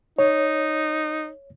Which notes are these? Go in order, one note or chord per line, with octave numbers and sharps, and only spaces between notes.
D#4 C#5